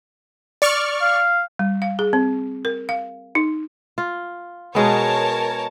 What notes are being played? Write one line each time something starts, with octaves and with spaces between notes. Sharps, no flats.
D5 C#6 F6
F5
G3
F5
G#4
C4
A#4
F5
D#4
F4
B2 G#3 B3 A#4 C#5 A5